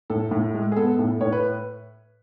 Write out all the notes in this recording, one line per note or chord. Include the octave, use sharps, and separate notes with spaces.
A2 A4
A2
G#3
G#4
B3 A4
A2
A2 C#5
B4